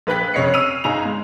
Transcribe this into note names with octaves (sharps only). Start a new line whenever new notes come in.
A#1 B4 G5 F#6 B6
F1 C#3 C#5 D#5 C7 C#7
E6 F6 D#7 F7
G1 D#4 G#4 F5 A#5 F7
G#3